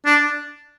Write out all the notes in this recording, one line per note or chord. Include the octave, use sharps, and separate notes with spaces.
D4